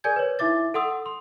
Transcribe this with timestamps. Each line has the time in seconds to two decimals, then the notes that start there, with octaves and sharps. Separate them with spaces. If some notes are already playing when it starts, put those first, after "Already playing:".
0.04 G#4 A#4 D5 G#5 G6 G#6
0.16 B4 C#5
0.39 D#4 E4 E5 D6 A6
0.74 A4 F#5 C6 D#6 E6
1.06 C6